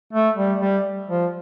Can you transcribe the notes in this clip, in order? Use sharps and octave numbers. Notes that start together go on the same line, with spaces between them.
A3
G3
G3
F3